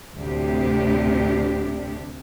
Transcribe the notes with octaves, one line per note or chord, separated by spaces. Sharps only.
D2 A2 C3 D4 G4